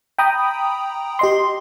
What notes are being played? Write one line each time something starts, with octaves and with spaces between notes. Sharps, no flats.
G5 A#5 B5 D#6
G4 D#5 C6